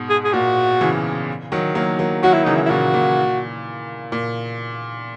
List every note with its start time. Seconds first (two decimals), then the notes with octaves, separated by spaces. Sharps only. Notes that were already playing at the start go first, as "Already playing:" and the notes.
Already playing: G#2 B2
0.10 G#4
0.24 G#4
0.34 A#2 F#4
0.81 C#3 E3
1.52 D#3 F#3
1.75 F#3 A#3
1.99 F#3 A#3
2.23 D#3 F#3 F#4
2.34 E4
2.44 C#3 E3 D#4
2.55 E4
2.66 E4
2.70 A#2 C#3 F#4
2.94 A#2
4.12 A#2